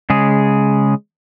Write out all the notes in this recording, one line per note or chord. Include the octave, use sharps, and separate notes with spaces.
C#3 G#3 G#4